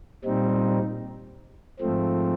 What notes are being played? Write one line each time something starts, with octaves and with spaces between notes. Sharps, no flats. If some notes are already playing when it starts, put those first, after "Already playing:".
A#2 G3 C4 D#4
G#2 F3 A3 C4